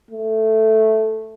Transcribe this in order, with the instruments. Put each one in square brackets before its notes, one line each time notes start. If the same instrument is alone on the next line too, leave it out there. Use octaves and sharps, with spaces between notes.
[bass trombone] A3